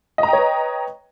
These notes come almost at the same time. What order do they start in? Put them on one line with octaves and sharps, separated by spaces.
D#5 A#5 G5 C#5 B4